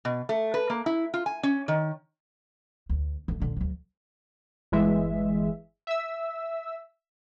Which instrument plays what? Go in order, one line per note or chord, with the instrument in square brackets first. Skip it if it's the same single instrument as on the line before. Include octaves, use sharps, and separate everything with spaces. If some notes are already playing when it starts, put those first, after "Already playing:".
[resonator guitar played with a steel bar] B2
A3
B4
A#3
E4
F4
G#5
C#4
D#3
[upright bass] D2
D3 A3
D#1 D3
D2 F#3
[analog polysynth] G1 E3 G#3 E5
E5 E6